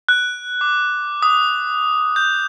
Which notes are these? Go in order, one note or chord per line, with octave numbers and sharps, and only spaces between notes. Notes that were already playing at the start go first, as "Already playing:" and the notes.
F#6
D6
D#6
G6